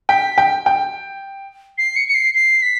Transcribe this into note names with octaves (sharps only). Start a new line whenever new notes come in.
G5 B6
G5
G5
C7
C#7
C#7
C7
C7
B6